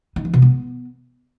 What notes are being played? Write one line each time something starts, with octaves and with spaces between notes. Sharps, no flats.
D#4
E3
B2
B3